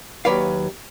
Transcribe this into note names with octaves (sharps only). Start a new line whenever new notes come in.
D#2 C#3 F#3 B4 D5 F5